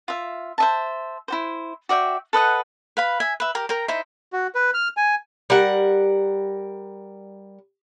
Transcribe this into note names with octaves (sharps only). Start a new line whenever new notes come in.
F4 E5
C5 E5 A5
E4 F#4 C5
F#4 D5 E5 G5
A4 B4 D#5 F#5
B4 F5 B5
E5 G#5
B4 E5
G4 A#4
A#4 G5 A#5
D#4 E4 C5 E5
F#4
B4
F6
G#5
G3 A#4 F#5